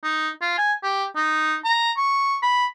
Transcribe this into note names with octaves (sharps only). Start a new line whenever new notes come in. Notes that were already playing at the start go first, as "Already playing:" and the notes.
D#4
F4
G#5
G4
D#4
A#5
C#6
B5